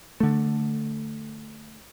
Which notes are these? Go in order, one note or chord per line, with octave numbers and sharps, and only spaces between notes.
D3 A3